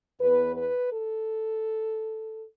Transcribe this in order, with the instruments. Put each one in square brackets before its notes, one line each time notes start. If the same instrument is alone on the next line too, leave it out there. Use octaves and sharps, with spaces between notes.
[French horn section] E2 E3 B3 B4
B4
A4